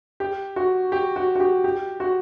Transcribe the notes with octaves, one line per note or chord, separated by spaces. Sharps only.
G4
F#4
G4
F#4
F#4
G4
G4
F#4